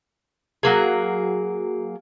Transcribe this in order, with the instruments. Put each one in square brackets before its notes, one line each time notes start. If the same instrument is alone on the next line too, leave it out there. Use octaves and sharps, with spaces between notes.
[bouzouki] F#3 A#3 G#4